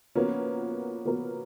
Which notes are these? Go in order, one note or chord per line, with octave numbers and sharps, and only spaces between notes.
F3 A#3 B3 C#4 F#4 A#4
F3 B3 F#4 A#4